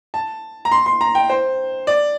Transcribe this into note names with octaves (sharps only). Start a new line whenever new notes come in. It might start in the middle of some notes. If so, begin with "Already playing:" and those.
A5
A#5
C6
C6
A#5
G5
C5
D5